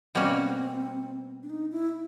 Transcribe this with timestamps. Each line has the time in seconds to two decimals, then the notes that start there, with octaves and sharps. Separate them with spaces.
0.15 B2 G3 A#3 C4 C#4 F#4
1.43 D4
1.50 D#4
1.71 E4